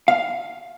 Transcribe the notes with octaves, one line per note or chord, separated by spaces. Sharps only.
F5